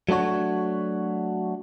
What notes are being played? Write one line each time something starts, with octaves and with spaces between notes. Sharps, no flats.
F#3 A3 D4 F#4 C#5